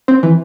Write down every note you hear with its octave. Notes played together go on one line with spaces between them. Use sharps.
C4
E3